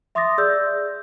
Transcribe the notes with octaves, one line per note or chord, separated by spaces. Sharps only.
E5 C6 D6 D#6 A6 A#6
G#4 D5 E6 G6